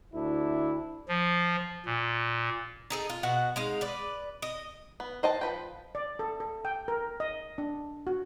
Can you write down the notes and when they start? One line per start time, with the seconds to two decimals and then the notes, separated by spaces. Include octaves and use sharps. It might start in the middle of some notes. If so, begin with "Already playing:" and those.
0.14 D2 D4 E4
1.08 F3
1.86 A#2
2.90 D#4 G#4 A4
3.10 F4
3.23 B2 F#4 F#5
3.56 G#3 D#4 F5
3.81 B4 D5
4.42 D#5
5.00 B3
5.23 C5 D#5 G5 A5
5.41 F3 B4 G5
5.95 D5
6.19 A4
6.40 A4
6.65 G5
6.88 A#4
7.20 D#5
7.58 D4
8.07 F#4